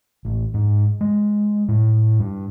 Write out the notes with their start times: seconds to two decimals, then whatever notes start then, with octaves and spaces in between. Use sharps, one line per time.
0.25 A1
0.54 G#2
1.01 G#3
1.68 A2
2.19 G2